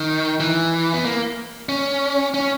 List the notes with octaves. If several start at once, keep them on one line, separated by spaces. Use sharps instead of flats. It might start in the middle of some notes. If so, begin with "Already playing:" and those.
Already playing: D#3
E3
B3
A#3
C#4
C#4